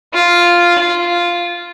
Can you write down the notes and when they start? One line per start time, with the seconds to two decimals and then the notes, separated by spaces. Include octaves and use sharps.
0.14 F4
0.79 F4